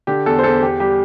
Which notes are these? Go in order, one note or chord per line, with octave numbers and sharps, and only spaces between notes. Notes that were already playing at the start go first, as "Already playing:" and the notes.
D3 G4
E2 A4
C5
E2 A4
E2 G4
G3 G4